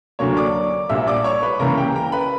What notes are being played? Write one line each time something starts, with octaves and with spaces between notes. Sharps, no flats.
D2 D3 F#3 A#3 C#5 C#6
D5 D6
A#1 A#2 G3 A#3 E5 E6
D5 D6
C#5 C#6
B4 B5
C#2 C#3 E3 A#3 A#4 A#5
G4 G5
A#4 A#5
B4 B5